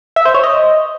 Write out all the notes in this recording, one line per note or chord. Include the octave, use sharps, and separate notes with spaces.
E5
C5
C#5
D#5